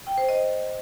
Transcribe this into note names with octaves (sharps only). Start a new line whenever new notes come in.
G5
C5
D#5